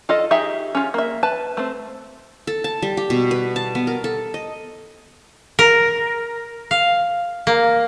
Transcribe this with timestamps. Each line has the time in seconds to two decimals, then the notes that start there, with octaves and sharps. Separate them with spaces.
0.09 F4 A4 D#5
0.31 D#4 G4 G#4 E5
0.75 C#4 F4
0.94 A#3 E5
1.23 B4 A5
1.57 A3 C4
2.47 A4
2.64 A5
2.82 G3
2.97 G4
3.10 B2
3.31 B4
3.56 A5
3.75 B3
3.87 A#4
4.04 A4
4.34 D#5
5.59 A#4
6.71 F5
7.47 A#3